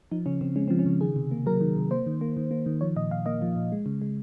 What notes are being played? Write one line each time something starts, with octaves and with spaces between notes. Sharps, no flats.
F3 D#4
C#3 C#4
C#3 C4
G#3 C#4
F3 C4
C#4
C#3
D#3 G#4
C3
A#3
F#3 A#4
D#3
C3
A#3 C5
D#3
A#3
D#3
A#3
D#3
F3 C#5
A#2 D#5
A#2 F5
A#3 D#5
F3
A#2
G#3
C#3
G#3